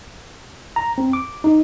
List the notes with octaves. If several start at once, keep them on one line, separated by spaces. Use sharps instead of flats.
A#5
C4
D6
D#4